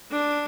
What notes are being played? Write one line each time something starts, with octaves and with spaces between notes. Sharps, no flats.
D4